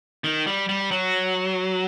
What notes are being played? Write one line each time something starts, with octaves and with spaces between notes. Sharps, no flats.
D#3
G3
G3
F#3